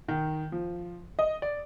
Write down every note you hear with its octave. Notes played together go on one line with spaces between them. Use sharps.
D#3
F3
D#5
D5